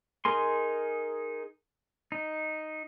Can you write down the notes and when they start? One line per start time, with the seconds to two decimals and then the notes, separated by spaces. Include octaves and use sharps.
0.25 D#4 G#4 A#4 G#5 C6
2.12 D#4